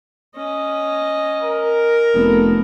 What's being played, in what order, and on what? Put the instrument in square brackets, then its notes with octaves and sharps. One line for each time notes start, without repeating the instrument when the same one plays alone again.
[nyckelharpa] C#4 D#5
[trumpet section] A#4
[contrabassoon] F1 [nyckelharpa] A3 B3